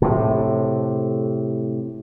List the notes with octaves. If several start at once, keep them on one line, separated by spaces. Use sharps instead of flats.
A2 C3